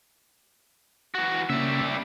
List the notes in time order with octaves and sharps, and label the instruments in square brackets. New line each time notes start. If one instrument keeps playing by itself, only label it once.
[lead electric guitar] E3 F#4
[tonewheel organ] C#3 A#3 C#4 [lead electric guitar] G3 E5